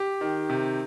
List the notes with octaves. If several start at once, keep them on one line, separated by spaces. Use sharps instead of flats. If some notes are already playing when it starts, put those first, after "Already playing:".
Already playing: G4
D#3
C3